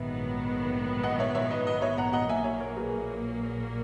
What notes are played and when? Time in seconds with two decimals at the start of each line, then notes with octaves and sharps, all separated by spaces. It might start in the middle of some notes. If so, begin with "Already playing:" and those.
Already playing: A#1 G#2 D#3 F#3 B3 E5
1.03 D#5 F#5
1.19 C#5 E5
1.35 C#5 E5
1.51 B4 D#5
1.66 B4 D#5
1.81 C#5 E5
1.98 F#5 A#5
2.13 D#5 F#5
2.28 A#1 A#2 F#3 A#3 E5 G#5
2.44 C#5 E5
2.60 A#4 C#5
2.76 G#4 B4